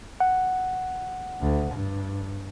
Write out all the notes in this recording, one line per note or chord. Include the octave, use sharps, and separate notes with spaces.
F#5
D2
G2